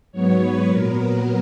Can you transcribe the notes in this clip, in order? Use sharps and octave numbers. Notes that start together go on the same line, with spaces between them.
G#2 F#3 B3 C#5
B4
A#2 F#3 B3 A#4